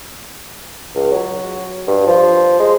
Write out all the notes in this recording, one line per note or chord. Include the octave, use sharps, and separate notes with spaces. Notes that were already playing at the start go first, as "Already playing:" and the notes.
C#2
F#3
G2
F3
G#3